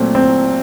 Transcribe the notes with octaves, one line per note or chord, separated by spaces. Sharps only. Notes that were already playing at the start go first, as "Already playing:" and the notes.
Already playing: A#2 F#3 A3 C4
C4